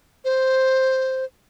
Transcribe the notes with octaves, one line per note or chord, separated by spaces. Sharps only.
C5